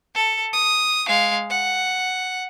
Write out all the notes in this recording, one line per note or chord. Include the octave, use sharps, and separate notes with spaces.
A4
D#6
G#3 F5
F#5